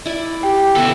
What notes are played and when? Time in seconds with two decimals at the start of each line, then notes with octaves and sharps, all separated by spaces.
0.06 E4 D5
0.43 G4 G5
0.75 C#2 B3 A4 E5